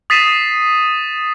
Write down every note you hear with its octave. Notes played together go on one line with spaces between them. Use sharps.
D#6 A6 B6 C7 D#7 E7